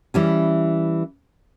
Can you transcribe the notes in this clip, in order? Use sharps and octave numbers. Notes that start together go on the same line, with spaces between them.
E3 G3 C#4